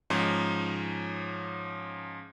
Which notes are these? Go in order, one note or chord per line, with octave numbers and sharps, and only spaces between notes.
G#2 F3 C#4 D#4